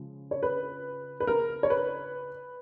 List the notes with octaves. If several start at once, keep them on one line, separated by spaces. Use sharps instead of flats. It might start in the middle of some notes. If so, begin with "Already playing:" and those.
Already playing: C#3 F3 G#3
C#5
B4
B4
A#4
C#5
B4